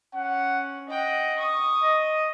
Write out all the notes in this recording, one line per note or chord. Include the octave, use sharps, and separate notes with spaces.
C#4 F#5
D#5 F#5 G5
C#6 D#6
D#5